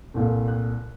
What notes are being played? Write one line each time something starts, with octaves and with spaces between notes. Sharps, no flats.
C2 A#2 A3
F#6